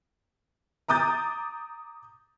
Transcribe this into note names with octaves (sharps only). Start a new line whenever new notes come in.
A#5 D6 D#6 G6 A6